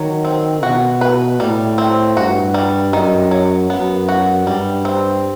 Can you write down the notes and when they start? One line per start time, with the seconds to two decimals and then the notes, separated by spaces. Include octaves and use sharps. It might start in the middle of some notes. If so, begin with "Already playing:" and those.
Already playing: D#3 F#3
0.25 C4
0.63 B2 F#4
1.01 B4
1.40 A2 G3
1.78 C4
2.17 G2 F#4
2.54 G3
2.93 F#2 D#3
3.31 F#3
3.70 F#2 B3
4.09 F#4
4.46 G2 G3
4.85 C4